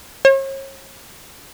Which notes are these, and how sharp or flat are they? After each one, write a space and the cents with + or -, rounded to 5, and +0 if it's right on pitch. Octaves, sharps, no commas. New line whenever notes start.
C#5 -40